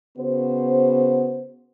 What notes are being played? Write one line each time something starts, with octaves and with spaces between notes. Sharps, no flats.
C#3 B3 F#4 C5